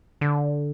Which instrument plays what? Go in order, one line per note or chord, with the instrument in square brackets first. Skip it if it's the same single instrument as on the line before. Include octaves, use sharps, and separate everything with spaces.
[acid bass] D3